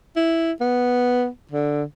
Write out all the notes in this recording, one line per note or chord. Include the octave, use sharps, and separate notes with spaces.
E4
B3
D3